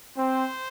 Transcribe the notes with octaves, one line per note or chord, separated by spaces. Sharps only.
C4 C5